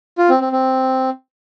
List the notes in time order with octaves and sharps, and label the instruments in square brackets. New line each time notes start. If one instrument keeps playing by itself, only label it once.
[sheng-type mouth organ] F4
C4
C4
C4